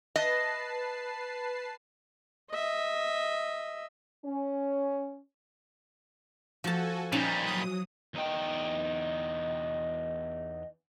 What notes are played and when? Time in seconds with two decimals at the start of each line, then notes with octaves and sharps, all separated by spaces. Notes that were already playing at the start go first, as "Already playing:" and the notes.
0.16 B4 D#5 A5 C7
2.53 D#5 E5
4.25 C#4
6.64 F3 F#4 A4 G#5 A5
7.12 A#2 G3 C#4 D#4 A5
7.46 F#3 D#6
8.14 E2 D#4 D#5 G5